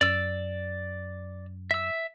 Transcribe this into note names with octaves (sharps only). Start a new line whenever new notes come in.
F#2 D5 E6
E5 E6